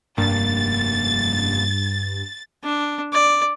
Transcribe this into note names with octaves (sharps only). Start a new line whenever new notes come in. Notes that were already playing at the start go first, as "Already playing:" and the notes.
F1 G2 A#3 A6
D4
D5